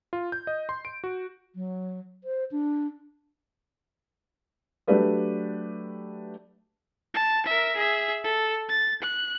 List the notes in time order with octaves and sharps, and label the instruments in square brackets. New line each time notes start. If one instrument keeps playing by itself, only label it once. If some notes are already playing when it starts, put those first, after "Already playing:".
[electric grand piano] F4
G6
D#5
C6
D7
F#4
[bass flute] F#3
C5
D4
[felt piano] F#3 A3 D4 G4 B4 D5
[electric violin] A5
A#4 E5
G#4 E5
A4
A6
F#6